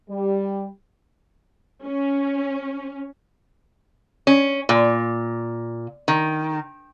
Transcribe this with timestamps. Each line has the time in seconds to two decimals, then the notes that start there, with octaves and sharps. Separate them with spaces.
0.10 G3
1.85 C#4
4.27 C#4
4.69 A#2
6.08 D#3